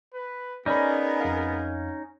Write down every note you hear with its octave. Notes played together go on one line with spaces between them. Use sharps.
B4
B3 C#4 D#4 G#4 A#4 D5 B5
F2 F5